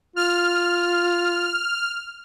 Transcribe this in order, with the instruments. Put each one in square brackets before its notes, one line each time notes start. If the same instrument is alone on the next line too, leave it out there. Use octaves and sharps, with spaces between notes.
[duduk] F4 [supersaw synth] F6